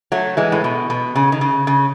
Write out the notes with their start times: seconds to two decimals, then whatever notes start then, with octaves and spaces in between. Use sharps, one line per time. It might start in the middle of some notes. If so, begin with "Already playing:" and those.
0.12 F#3 A3
0.37 E3 G#3
0.52 A2
0.64 B2
0.90 B2
1.15 C#3
1.32 D#3
1.41 C#3
1.67 C#3